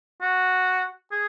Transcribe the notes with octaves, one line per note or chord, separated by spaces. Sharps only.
F#4
G#4